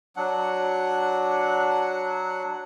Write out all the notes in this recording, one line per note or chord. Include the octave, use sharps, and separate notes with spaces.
F#3 D4 F#5